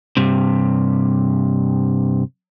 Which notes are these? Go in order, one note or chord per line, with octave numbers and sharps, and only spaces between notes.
G2 C3